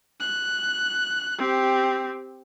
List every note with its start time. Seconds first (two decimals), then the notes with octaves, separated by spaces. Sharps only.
0.20 F#6
1.38 C4 G4